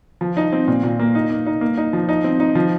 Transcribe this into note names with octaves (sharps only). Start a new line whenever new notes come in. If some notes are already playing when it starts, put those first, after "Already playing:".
F3
D#4
C4
A#2
A#2
A#3
D#4
A#3
D#4
A#3
D#4
F3
D#4
C4
D#4
F3